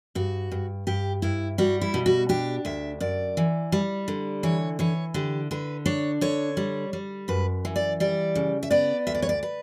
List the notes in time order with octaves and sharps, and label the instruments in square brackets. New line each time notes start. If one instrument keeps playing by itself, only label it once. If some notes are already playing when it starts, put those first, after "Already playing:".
[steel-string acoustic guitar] G2 F#4
G2
G2 G4
G2 E4
G3 F#4
E4
B2
F#4
D4 G4
D2 E5
F#2 D5
E3
G3
D3
E3 C#5
E3 C#5
D3 G4
D3 B4
D4 C#5
D3 C#5
G3
G3
F#2 B4
E3
D5
G3 D5
C#3
E5
B3 D5
D2 E5
D5
C#5
D5
B4